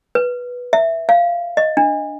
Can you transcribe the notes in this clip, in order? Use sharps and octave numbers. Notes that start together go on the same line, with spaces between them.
B4
E5
F5
D#5
D4